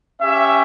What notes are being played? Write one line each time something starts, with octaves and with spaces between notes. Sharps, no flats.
C#4 G4 E5